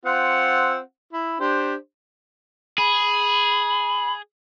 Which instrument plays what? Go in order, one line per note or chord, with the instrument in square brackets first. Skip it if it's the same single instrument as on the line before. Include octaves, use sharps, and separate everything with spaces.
[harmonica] C4 F4 F#5
E4
D4 G4 C5
[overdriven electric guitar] G#4 [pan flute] B5